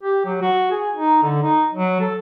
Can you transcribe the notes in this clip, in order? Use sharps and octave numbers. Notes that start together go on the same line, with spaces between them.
G4
F#3
F#4
G#4
D#4
D3
D#4
F#3
A4